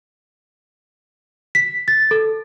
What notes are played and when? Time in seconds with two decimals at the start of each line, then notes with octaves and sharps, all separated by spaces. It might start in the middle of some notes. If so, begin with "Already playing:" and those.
1.55 B6
1.88 A6
2.11 A4